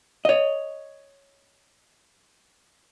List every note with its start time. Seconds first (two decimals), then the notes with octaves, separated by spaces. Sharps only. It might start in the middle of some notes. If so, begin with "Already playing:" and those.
0.25 C#5 D#5